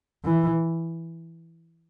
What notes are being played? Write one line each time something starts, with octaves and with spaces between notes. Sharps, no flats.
E3